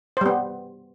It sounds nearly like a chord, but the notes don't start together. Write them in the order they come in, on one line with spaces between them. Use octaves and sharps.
C5 G3 B3